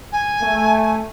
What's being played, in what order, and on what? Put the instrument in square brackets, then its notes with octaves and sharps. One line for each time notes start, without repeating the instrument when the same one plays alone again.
[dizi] G#5
[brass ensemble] A3